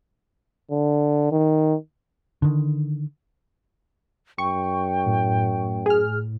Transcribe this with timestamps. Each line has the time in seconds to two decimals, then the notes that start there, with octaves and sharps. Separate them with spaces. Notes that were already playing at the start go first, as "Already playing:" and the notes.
0.71 D3
1.31 D#3
2.42 D3 D#3
4.38 F#2 G5 C#6
5.06 A2
5.86 G#4 F6